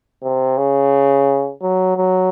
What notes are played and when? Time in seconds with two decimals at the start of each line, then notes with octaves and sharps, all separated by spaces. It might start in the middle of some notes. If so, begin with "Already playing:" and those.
0.23 C3
0.57 C#3
1.62 F#3
1.96 F#3